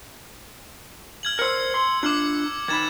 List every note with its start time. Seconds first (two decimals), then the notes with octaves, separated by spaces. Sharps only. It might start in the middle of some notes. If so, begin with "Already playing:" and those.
1.23 F6 G#6 F#7
1.39 A#4 C5 E6 C#7
1.74 C6
2.03 D4 F4 D6 F6 F#7
2.68 D#3 D#4 B5 G#6 A6 E7